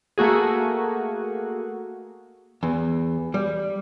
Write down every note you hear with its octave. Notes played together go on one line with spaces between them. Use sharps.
A3 A#3 F#4 G#4
E2
G3